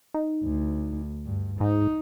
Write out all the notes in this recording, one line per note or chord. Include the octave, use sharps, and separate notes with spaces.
D#4
D2
G2
G#2 D#4